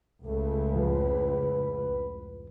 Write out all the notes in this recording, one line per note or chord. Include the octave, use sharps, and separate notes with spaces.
C#2 A3
F2 A2 F3 B4